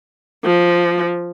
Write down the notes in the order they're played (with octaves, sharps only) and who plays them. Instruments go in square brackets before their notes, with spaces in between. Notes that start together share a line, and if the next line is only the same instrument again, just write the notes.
[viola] F3